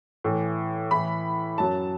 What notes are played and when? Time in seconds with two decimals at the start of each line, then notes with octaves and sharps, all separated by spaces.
0.24 A2 E3
0.91 A2 E3 B5
1.58 F#2 F#3 A5